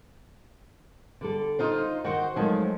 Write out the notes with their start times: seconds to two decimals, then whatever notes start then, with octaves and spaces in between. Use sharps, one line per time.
1.21 D3 G3 A4
1.59 D#4 F4 C5
2.04 D#3 F#4 C5 D#5 F#5
2.36 D#3 F3 F#3 G#3 A3